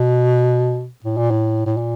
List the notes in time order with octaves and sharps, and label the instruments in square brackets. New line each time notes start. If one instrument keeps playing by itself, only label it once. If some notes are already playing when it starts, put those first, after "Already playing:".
Already playing: [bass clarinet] B2
A2
A#2
A2
A2
A#2